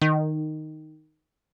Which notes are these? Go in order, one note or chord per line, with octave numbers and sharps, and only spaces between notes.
D#3